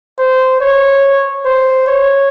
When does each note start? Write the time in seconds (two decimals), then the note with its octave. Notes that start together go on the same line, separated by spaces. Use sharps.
0.18 C5
0.61 C#5
1.45 C5
1.87 C#5